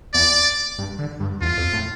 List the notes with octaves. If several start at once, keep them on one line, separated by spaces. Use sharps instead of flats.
E2 D5
G2
D3
G2
E2 F4
F2
A2